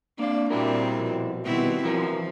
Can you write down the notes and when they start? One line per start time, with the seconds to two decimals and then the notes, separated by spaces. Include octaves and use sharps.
0.19 A#3 C4 D4 D5 F5
0.50 A#2 G3 C4 E4 F#4 A#4
0.97 B2 F3
1.44 B2 D#3 G3 B3 C4 E4
1.84 C2 E3 F3 F#4 A#4